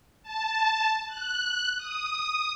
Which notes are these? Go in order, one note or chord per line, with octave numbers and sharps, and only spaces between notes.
A5
F#6
D#6